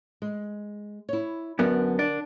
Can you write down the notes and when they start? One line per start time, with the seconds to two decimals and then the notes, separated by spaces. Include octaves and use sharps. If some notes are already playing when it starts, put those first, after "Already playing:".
0.22 G#3
1.09 E4 C#5
1.59 F#2 D3 B3 A#4 D5
1.99 D4